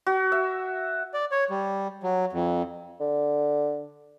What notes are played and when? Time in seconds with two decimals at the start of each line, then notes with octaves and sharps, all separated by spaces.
0.07 F#4
0.32 E5
1.14 D5
1.31 C#5
1.50 G3
2.03 F#3
2.33 F2
3.00 D3